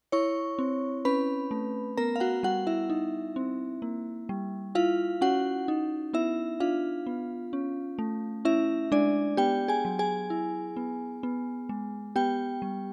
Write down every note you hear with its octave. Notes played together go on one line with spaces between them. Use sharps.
E4 C#5 C#6
C4
C#4 B4 B5
A3
B3 A#4 A#5
F5
F#4 F#5
G3 F#4 F#5
E4 E5
D#4
C4
A#3
G3
E4 F4 F5
C#4 F#4 F#5
D#4
B3 E4 E5
D4 F4 F5
B3
C#4
A3
C#4 E4 E5
G#3 D4 D5
B3 G4 G5
G#4 G#5
F#3
G#4 G#5
E4
B3
B3
G#3
B3 G4 G5
G3